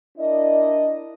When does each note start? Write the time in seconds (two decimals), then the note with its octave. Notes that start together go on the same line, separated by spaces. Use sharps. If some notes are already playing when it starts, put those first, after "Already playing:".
0.18 D4 E4 A#4 D5 D#5